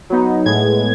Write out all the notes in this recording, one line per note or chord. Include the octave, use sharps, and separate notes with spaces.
F#3 B3 D#4
A2 G#3 B3 G#6